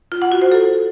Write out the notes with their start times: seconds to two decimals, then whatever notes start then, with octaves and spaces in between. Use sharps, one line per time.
0.12 F4
0.22 F#5
0.32 F#4
0.42 C5
0.52 A4